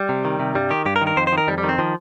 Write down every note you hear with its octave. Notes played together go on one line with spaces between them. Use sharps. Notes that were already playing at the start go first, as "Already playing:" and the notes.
Already playing: G3
C3
D#3
C3
G2 G3
D#3 G4
G2 G4
A#4
D#3
A#4
F2 C5
C5
D#3 A#4
F2 G3
G3
D#3
C4
D#3 F3